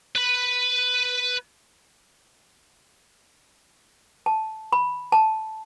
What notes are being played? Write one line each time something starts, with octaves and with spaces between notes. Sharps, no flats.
B4 B5
A5
B5
A5